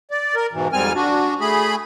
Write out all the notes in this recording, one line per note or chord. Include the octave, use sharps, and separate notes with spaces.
D5
A#4
G#2 B2 E3
F2 G#2 G3 C4 G#5 F6
D4 F#4
A3 G#4 B5